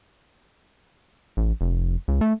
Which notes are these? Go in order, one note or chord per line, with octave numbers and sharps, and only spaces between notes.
A1
F1
C#2
A3